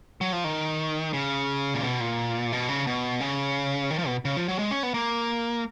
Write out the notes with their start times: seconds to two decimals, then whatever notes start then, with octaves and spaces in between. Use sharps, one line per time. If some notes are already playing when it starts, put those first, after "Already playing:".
0.21 F#3
0.32 F3
0.44 D#3
1.13 C#3
1.74 A#2
1.83 B2
2.00 A#2
2.52 B2
2.69 C#3
2.87 B2
3.20 C#3
3.90 D#3
3.98 F3
4.07 B2
4.25 C#3
4.37 F3
4.48 F#3
4.59 G#3
4.71 C#4
4.83 B3
4.94 A#3